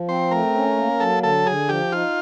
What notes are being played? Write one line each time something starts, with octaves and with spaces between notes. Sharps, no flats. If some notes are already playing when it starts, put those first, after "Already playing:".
Already playing: F3
C4 C5
A3 A#4
C#4
A#3
F#3 A4
D3 A4
D3 G#4
F3 G4
D#4 F4